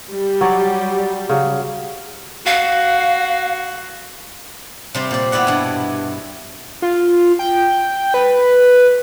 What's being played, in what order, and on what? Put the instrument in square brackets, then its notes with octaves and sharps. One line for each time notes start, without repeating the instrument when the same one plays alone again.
[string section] G3
[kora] F#3 C#5 D5
C#3 F#3
[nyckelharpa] F#4 [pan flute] F5
[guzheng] C3 G3 C5
A#2 D5
B3 E4 D5 F#5
G2 B2
[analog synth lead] F4
G5
B4